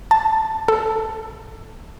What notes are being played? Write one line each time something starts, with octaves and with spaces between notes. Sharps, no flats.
A5
A4